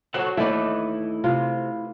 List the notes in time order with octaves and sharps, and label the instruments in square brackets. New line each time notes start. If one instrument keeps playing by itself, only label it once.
[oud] F#3 F#4 [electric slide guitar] A4 C5 F#5
[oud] D#2 D#4 D5 [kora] A3 [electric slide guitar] E4 B4
[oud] C3 [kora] F4